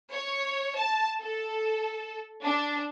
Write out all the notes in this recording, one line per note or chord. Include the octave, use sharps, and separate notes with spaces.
C#5
A5
A4
D4